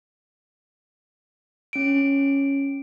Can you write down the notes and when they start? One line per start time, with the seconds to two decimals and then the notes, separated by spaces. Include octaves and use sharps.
1.73 C#4 D7